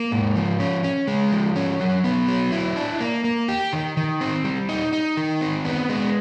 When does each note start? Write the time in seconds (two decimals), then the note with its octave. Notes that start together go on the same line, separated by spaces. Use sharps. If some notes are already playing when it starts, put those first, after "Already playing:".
Already playing: A#3
0.12 G#2
0.35 F3
0.60 C#4
0.84 C#4
1.07 G#3
1.32 F3
1.56 C#4
1.80 F#3
2.04 B3
2.28 F#3
2.52 E4
2.76 D4
3.00 A#3
3.24 A#3
3.48 G4
3.73 D#3
3.97 D#3
4.21 C4
4.44 G3
4.69 D#4
4.93 D#4
5.17 D#3
5.41 C4
5.65 B3
5.89 G#3